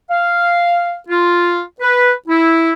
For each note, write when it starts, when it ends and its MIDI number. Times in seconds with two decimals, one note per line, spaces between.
0.11 0.96 77
1.09 1.60 65
1.81 2.11 71
2.28 2.73 64